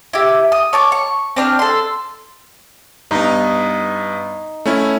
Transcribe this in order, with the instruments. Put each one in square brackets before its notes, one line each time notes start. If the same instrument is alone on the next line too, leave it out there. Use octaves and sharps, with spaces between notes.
[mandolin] E4 G4
D#6
C#5 A5 D6
C#6
C4 D4 F6 F#6
A4 C6
[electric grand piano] G2 B3 [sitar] D#4
[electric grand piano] A3 C#4 E4